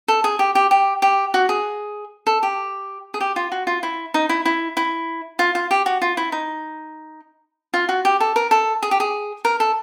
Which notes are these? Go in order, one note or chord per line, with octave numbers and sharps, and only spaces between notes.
A4
G#4
G4
G4
G4
G4
F#4
G#4
A4
G4
G#4
G4
F4
F#4
F4
E4
D#4
E4
E4
E4
F4
F4
G4
F#4
F4
E4
D#4
F4
F#4
G4
A4
A#4
A4
G#4
G4
G#4
A#4
A4